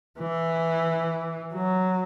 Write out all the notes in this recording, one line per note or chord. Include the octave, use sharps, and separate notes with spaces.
E3
F#3